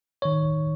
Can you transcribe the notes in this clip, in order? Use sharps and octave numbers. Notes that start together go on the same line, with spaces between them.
D#3 C#5